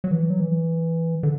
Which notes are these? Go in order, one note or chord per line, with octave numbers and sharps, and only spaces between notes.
F#3
E3
F#3
E3
D3